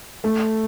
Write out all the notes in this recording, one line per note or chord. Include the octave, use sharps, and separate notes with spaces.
A3